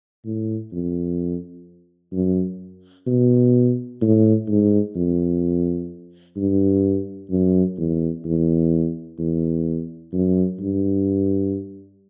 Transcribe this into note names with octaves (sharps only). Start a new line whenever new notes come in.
A2
F2
F#2
B2
A2
G#2
F2
G2
F#2
E2
E2
E2
F#2
G2